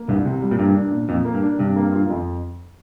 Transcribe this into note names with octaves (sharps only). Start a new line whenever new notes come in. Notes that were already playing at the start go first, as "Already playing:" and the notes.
Already playing: A#3
C2 G2
C3
G3
A#2
G2 A#3
D4
A#2
F2 A#2
A#3
G2
D4
G2 C3
A#3
F4
F2